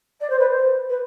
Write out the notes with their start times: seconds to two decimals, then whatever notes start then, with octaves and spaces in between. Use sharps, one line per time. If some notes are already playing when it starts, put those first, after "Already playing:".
0.20 D5
0.30 C5
0.39 B4
0.49 C5
0.89 B4